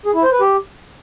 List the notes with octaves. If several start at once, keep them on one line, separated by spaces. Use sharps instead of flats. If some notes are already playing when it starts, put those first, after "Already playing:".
G#4
E4
C5
B4
G4